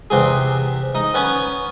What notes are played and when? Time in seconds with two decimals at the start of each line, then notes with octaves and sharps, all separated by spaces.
0.10 E2 C3 G#4
0.95 D#4
1.14 B3 C#4 G#5